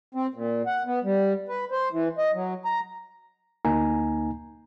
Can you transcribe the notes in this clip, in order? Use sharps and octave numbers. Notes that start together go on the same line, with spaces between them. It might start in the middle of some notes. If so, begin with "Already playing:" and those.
C4
A#2
F#5
B3
G3
B4
C5
E3
D#5
F#3
A#5
D2 A#3 D#4 G#5 A#5